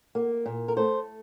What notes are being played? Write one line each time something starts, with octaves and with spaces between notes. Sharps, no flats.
A#3
A#2
A#4
A3 C5